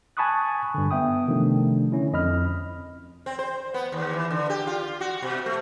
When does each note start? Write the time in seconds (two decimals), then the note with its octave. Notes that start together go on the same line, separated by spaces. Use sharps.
0.17 G#5 A5 B5 C#6 D#6 F#6
0.74 G2 D3
0.91 B3 E5 G5 D#6
1.27 C3 D#3 F3 A3 D4
1.92 D3 C#4 E4
2.13 F2 D#5 B5 F6
3.26 C4
3.39 C5
3.74 B3
3.92 D#2
4.13 E3
4.31 D3
4.50 G4
4.67 F4
5.01 F#4
5.22 B2
5.46 A3